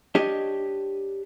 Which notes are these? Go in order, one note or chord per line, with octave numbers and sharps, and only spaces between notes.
D4 G4 C#5 D#5